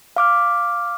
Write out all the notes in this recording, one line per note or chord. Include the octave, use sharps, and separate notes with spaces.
F5 D6 F6